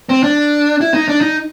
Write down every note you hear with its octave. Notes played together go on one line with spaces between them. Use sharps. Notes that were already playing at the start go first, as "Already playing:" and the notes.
C4
D4
E4
D#4
D4
D#4